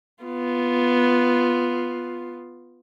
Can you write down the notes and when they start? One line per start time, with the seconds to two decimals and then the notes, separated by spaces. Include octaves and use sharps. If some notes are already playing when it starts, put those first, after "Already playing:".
0.24 B3 F4